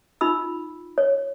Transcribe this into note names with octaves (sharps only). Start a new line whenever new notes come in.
D#4 F4 B5 E6
C#5